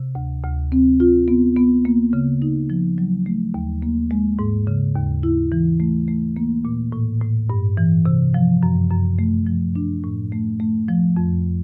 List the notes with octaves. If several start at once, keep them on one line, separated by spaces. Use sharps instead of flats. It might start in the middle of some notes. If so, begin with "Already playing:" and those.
Already playing: C3
D2
D2
C4
F4
B3
B3
A#3
C#3
D#4
F3
F#3
A3
D#2
A#3
G#3
G#2
C#3
D#2
E4
E3
A3
A3
A#3
A#2
A2
A2
G2
E3
C3
F3
F#2
F#2
A3
F3
D4
A2
A3
A3
F3
F2